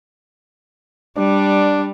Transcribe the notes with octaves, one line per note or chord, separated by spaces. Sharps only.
G3 D4